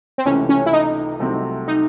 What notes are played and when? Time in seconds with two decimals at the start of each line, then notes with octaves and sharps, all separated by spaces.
0.18 C4
0.26 C#2 C3 E3 A3 C#4
0.49 C#4
0.66 E4
0.73 D#4
1.20 C2 C3 F#3 A3 C4
1.68 D#4